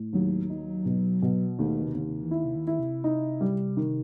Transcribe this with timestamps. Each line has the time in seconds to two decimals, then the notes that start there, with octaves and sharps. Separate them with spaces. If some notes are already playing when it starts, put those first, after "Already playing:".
Already playing: A2
0.13 D#2 F#3
0.50 D#4
0.85 B2
1.22 B2
1.59 D#2 A3
1.83 C3
1.95 D#2
2.08 C3
2.23 E3
2.31 D#3 E4
2.45 C3
2.55 D#3
2.67 D#3 E4
2.79 C3
3.04 D#4
3.41 G3
3.77 D#3